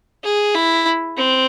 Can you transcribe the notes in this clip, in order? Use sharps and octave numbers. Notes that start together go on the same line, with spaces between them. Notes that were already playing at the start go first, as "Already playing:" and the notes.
G#4
E4
C4